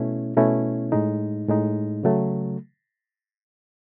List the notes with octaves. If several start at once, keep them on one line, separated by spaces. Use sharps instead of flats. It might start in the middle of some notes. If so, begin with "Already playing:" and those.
Already playing: B2 A3 C#4 E4
B2 A3 C#4 E4
A2 G#3 D#4
A2 G#3 D#4
C#3 F#3 A3